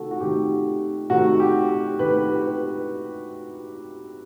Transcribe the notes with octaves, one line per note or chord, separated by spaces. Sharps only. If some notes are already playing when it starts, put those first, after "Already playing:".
Already playing: C3 D#3 A3 F#4 A4
F#4
C3 D#3 A3 G4
C3 D#3 A3 F#4
G4
G4
C3 D#3 A3 G4 B4
G4
B4